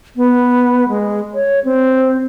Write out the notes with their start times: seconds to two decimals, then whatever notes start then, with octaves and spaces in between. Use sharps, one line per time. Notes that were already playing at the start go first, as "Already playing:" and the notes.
0.16 B3
0.88 G#3
1.34 C#5
1.65 C4